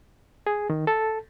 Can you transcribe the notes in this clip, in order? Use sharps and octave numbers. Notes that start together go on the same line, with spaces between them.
G#4
D#3
A4